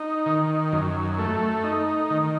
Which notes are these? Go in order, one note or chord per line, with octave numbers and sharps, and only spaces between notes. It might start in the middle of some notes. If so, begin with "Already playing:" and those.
Already playing: D#4
D#3
F#2
A3
D#4
D#3